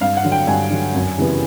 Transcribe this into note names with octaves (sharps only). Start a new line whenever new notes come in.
G2 F5
F#5
D3 F#3
G5
G2 G#5
D3 F#3
F#2
C#3 E3 G3 B3